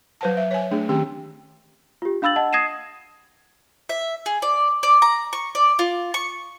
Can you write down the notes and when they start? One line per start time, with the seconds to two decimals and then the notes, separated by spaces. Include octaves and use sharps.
0.21 F#3 B4 C5 F#5 A5
0.37 E5
0.51 C#5 G#5
0.71 A3 D4 G#4
0.89 D#3 C4 C#4 G4 G5
2.02 F4 G4
2.22 D4 F5 B5 E6 A6 F#7
2.36 D#5 F#5 A5
2.53 D#6 G#6 A#6 C7 D#7 E7
3.89 E5
4.26 G#4
4.42 D5
4.83 D5
5.02 A#5
5.33 C#6
5.55 D5
5.79 F4
6.14 C#6